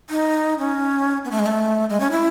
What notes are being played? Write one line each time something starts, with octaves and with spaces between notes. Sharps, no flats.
D#4
C#4
B3
A3
G#3
A3
G#3
C#4
E4